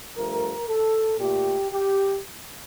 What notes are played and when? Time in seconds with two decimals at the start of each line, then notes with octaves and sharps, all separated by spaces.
0.16 G2 F3 A3 A#4
0.67 A4
1.19 A#2 A3 G4
1.71 G4